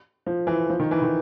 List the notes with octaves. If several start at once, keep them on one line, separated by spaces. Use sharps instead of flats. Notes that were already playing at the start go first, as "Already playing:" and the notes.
F3
E3
F3
D#3
E3
D#3